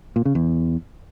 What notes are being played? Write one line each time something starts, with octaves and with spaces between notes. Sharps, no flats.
A#2
C#3
E2